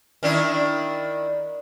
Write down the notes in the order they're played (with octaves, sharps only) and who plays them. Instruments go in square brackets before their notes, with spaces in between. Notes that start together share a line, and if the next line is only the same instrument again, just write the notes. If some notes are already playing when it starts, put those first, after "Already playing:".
[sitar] D#3 D4 E4